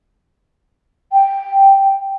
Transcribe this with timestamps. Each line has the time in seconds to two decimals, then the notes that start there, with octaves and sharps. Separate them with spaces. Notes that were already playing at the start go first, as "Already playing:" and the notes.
1.12 G5